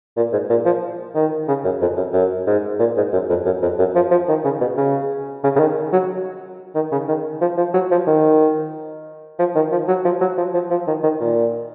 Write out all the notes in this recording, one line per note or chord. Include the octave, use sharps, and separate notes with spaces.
A#2
G#2
A#2
F3
D#3
C#3
F#2
F2
F#2
F#2
G#2
A#2
G#2
F#2
F2
F#2
F2
F#2
F3
F3
D#3
C#3
B2
C#3
C#3
C#3
D#3
F#3
D#3
C#3
D#3
F3
F3
F#3
F3
D#3
F3
D#3
F3
F#3
F3
F#3
F3
F3
F3
D#3
D#3
A#2